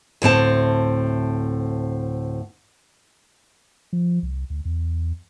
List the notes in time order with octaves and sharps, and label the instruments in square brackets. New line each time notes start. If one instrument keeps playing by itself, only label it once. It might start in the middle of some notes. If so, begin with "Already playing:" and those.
[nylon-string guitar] D2 A2 C4 A5
[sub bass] F3
C2
D2
E2